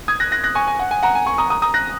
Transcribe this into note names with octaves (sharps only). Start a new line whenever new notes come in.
D#6 G#6
F#6 A#6
F#6 A#6
F#6 A#6
G#5 C#6
G#5
F#5
G#5
F#5 A#5
G#5
G#5 C#6
A#5 D#6
A#5 D#6
A#5 D#6
F#6 A#6